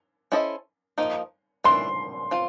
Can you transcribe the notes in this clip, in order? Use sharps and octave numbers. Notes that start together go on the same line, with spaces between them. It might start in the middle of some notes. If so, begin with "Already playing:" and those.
C#4 E4 A4 C5 D#5
F3 A#3 D#4
E3 A3 D4 C6
C4 F4